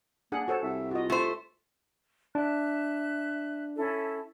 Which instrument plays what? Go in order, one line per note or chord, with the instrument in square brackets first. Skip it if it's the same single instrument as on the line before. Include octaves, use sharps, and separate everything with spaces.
[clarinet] A#3 [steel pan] D4 G#4 F#5
[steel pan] F#4 A4 C#5 [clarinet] C5
[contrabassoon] C2 [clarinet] E5
[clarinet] F4 [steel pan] F#4 D#5
[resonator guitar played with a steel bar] A3 C5
[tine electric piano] D4 [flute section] E5 F#6
[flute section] C#4 E4 A4